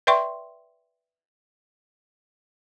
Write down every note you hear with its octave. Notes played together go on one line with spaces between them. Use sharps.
B4 D5 E5 G5 C6 C#6